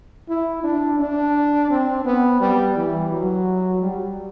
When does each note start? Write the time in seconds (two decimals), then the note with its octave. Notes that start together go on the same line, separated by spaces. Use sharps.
0.29 E4
0.64 D4
0.99 D4
1.70 C4
2.05 B3
2.41 G3
2.76 E3
3.11 F#3
3.82 G3